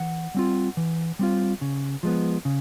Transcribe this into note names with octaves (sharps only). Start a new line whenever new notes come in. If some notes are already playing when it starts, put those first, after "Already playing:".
Already playing: E3 F#5
G3 C4 F4
E3
G3 C4 F4
C#3
F3 G#3 B3
C#3